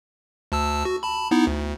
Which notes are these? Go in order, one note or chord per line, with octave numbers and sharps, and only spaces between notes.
D2 A5 E6
F#4
A5 B5
B3 D#4 E4
D2